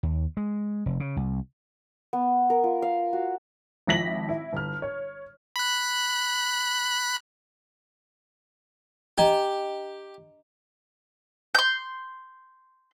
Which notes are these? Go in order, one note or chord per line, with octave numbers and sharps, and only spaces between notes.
D#2
G#3
F1
C#3
C2
B3
A#4
F4
F5
F#4
G#1 F3 E4 A#6 B6 F#7
E4
G1 F6
C#5
B5 F#6
D4 G4 D#5 A#5
C6 G6